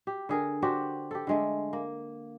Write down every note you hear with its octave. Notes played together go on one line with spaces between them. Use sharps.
G4
D3 G#4 A#4
D4 F#4 G4 C5
G4 A4
D3 G#3 A3
A#3